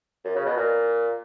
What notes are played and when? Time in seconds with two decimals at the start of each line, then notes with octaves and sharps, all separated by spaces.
0.25 F#2
0.35 C#3
0.46 B2
0.56 A#2